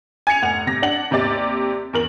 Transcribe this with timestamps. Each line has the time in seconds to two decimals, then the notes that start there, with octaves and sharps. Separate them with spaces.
0.27 G#5 G#6 C#7 F7
0.42 F1 F#5 F7
0.67 C3 A#6
0.82 D4 F#5 F#7
1.11 D#2 C3 G4 D5 A6
1.93 E2 A#4 F#7